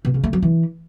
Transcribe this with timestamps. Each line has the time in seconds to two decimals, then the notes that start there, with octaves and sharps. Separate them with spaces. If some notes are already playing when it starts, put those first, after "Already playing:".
0.05 B2
0.14 C#3
0.24 A3
0.33 F#3
0.42 E3